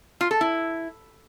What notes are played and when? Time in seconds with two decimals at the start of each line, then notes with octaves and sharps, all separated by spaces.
0.21 F4
0.31 A4
0.41 E4